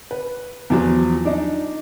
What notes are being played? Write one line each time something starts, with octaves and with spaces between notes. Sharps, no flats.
B4
E2 F3 F#3
D4 D#4